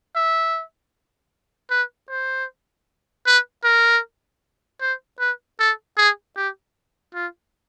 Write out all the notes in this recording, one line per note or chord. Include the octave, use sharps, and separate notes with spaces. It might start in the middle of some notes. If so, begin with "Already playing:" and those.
E5
B4
C5
B4
A#4
C5
B4
A4
G#4
G4
F4